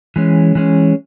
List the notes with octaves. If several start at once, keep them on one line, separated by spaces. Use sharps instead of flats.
E3 G#3 C#4
E3 G#3 C#4